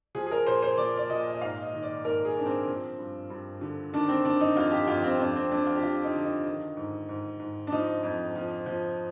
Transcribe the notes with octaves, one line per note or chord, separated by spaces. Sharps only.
F3 G#4
G#4
A#4
A#2 C5
C5
F3 D5
D5
A#2 D#5
D#5
G#2 F5
D#5
D#3
D5
G#2 A#4
G#4
G#2 D4
C4
F3
G2
G2
D3
D#3 D4
C4
D#3 D4
D#4
F2 F4
G4
F2 F4
C4
F2 D4
C4
F2 D4
F4
G4
F3 F4
D#4
D3
D#4
D#3
G#2
G#2
G#2
D4
F3 D#4
F2
F3
F3